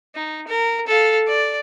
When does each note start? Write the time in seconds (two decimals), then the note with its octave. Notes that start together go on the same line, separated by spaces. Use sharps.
0.15 D#4
0.47 A#4
0.87 A4 F5
1.28 D5